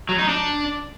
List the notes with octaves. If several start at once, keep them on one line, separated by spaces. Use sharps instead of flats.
F#3
D#4
D4